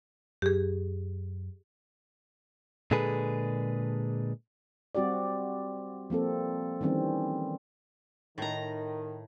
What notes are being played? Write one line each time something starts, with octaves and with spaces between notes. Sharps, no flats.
F#2 G4 G#4
A#2 D3 G#3 G#4 A4 B4
G3 C4 F#4 G4 D5
F3 A#3 C4 A4
D#3 E3 G3 C4 C#4
A2 D#3 A#5